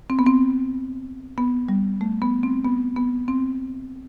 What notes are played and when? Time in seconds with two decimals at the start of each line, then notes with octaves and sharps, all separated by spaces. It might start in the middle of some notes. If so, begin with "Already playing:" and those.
0.10 C4
0.19 B3
0.26 C4
1.38 B3
1.69 G3
2.01 A3
2.22 B3
2.43 C4
2.65 B3
2.96 B3
3.28 C4